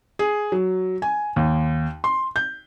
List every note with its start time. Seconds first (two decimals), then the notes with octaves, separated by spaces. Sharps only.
0.19 G#4
0.52 F#3
1.02 G#5
1.36 D#2
2.04 C6
2.36 G6